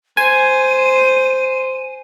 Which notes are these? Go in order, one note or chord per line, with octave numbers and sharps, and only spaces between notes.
C5 G#5 D#7